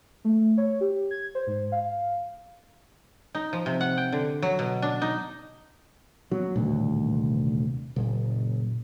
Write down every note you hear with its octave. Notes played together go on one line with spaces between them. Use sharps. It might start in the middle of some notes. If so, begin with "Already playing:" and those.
A3
C#5
G4
G#6
C5
G#2
F5
D#4
F3
C3
F#5
G5
D3
F#3
B2
D4
D#4
F#3 A#3 B3 C#4
D#1 D2 A2 C#3
C3
F#1 A#2